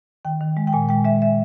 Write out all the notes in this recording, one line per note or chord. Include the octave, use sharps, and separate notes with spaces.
D#3 G5
D#3
G#3
G5
A#2 G#5
G#3 G5
G#3 E5
E5